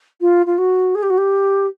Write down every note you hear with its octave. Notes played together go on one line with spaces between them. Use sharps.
F4
F4
F#4
G#4
G4
F#4
G4